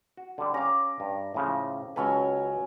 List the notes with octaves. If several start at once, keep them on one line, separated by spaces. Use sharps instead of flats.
F#4
D3 G3
C#4 G4 F5 A#5 D6
G2
A2 C#3 F3
C#2 F#3 C#4 A4 B4 G#5